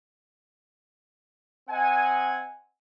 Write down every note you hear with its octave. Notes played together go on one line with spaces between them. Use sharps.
C4 D#5 F#5 G#5